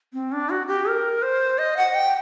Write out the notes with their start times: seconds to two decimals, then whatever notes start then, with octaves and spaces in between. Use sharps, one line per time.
0.13 C4
0.32 D4
0.50 F#4
0.67 G4
0.86 A#4
1.22 C5
1.58 D#5
1.77 F#5
1.95 G5